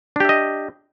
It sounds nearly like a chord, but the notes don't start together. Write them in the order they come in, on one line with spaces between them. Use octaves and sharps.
D4 G4 E5 D#5